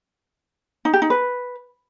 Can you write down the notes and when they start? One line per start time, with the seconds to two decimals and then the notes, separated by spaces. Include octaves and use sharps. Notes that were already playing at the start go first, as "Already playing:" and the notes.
0.85 D#4
0.93 G4
1.02 D#4
1.10 B4